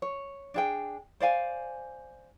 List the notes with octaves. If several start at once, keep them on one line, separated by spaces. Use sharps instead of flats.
C#5
D4 G#4 G5
C5 D5 F5 G#5